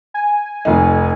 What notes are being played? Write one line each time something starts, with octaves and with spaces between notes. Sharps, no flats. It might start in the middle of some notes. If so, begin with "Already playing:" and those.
G#5
F1 F2 D#4